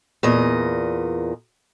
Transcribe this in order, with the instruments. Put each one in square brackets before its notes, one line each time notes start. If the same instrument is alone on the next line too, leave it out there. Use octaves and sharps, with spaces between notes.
[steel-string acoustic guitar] E2 A#2 D#5